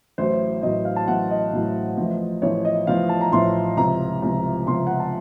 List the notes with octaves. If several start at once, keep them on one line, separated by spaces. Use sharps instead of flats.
A1 A2 F#3 C5
A1 A2 F#3 D#5
F5
A5
A1 A2 F#3 F#5
D#5
A1 A2 F#3
A1 A2 F3
A1 A2 F3 C#5
D#5
A1 A2 F3 F5
A5
A#5
A1 A2 F3 C6
C#2 C3 F3 A#5
C#2 C3 F3
C#2 C3 F3 C6
F#5
A5